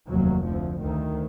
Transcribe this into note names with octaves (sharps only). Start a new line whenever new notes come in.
F1 D#2 F#3
D2 F3
D2 D#3